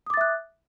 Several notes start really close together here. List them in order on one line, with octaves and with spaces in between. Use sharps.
D#6 D6 A6 E5 F#6